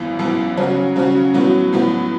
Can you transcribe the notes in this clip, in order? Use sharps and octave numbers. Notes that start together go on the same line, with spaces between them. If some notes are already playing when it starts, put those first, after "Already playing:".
Already playing: G#1 F#2 E3 B3
G#1 F#2 E3 B3
C#3 F#3 C#4 F#4
C#3 F#3 C#4 F#4
A2 F#3 B3 F#4
A2 F#3 B3 F#4